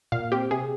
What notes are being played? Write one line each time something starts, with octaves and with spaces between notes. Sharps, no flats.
A#2 F5
C4 G4
C3 G#4